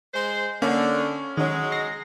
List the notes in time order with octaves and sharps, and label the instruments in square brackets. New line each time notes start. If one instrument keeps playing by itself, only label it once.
[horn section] G#3 C5
[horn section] D3 [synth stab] A#3 [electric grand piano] C#4
[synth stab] D#3 C#4 [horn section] F#3 G#3
[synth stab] A#6 [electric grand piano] C7